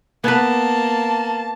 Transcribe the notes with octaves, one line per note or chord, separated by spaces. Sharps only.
A#3 B3 B4 A5